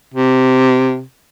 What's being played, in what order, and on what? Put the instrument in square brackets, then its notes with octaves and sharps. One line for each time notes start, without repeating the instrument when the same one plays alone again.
[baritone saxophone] C3